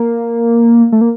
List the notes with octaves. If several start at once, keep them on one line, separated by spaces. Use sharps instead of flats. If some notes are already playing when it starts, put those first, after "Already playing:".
Already playing: A#3
A3
A#3